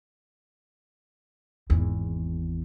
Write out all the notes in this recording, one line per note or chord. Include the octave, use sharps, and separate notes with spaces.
G#1 E2